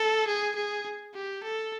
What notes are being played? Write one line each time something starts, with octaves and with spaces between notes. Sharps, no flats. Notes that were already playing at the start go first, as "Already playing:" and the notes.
Already playing: A4
G#4
G#4
G4
A4